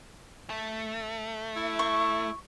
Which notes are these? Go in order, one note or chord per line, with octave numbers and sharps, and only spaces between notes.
A3
E4
C#6